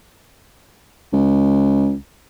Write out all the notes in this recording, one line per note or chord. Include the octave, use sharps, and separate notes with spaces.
C#2